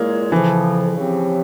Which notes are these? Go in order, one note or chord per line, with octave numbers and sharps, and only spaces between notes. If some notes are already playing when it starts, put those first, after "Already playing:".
Already playing: A#2 G#3 A#3 E4 G#4 C#5
F2 C#3 E3 F3
C#3 F3 C4 G4